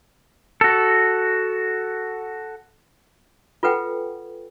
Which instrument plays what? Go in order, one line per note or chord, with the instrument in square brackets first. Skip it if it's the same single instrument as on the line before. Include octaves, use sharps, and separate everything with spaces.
[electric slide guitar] F#4 A4
[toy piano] F4 A4 B4 F#5 G5